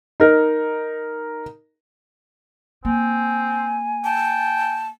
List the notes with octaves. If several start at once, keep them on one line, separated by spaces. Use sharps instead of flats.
D#4 A#4
A#3 C4 G#5
G5 A5